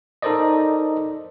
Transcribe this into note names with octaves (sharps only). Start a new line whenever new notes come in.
D#4 A4 A#4 C5 D5 D#5